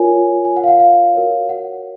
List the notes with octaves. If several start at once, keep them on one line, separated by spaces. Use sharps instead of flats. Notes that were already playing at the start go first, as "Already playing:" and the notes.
Already playing: F4 A#4 C#5 G#5
G#5
F#5
F5
F#5
F5
F#4 A#4 C#5
F#5